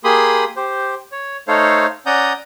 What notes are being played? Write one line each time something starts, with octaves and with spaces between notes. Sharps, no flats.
A#3 G4 G#4 B5 C6 D#6
G4 C5
C#5
A3 D#4 A4 C5 C#5 F5
C#4 D5 F#5 A#5 D#6 G6